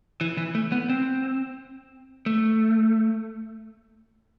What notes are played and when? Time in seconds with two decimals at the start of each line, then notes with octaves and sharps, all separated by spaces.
0.21 E3
0.37 E3
0.55 A3
0.72 B3
0.90 C4
2.26 A3